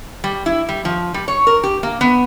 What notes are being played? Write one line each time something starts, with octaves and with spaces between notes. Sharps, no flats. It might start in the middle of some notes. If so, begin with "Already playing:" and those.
G3
E4
G3
F3
G3
C#5
A#4
G4
A#3
B3